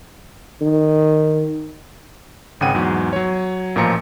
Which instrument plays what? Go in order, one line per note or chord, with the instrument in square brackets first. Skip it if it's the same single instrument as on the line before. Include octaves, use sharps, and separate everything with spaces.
[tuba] D#3
[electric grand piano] G#1 C#3 G#4 F#5 G5 D#7
E2 G#2 F#3
F#3 C#5
A1 A#2 F3 A#5 C#7